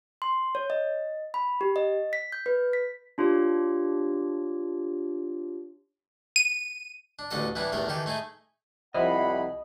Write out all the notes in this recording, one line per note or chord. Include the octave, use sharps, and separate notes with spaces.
C6
C#5
D#5
B5
G4
D#5
B6
G6
B4
B6
D4 F4 G4 C#5
D#7
D4
A1 D2 B3 D4 A4 D#5
E3 G3 B3 D4 E4
E2 G2 A3 A#4
D#3 E3 G4 A4
A3 D#4 E4 G#4
C2 F3 E4 D#5 F#5 B5 C7